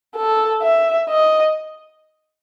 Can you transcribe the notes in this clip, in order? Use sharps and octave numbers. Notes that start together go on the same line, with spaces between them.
A4
E5
D#5